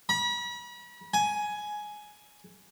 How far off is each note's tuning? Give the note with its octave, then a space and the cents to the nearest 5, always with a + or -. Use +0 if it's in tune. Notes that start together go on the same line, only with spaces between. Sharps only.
B5 -40
G#5 +10